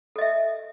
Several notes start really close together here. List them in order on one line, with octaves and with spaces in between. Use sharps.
A4 D#5 E5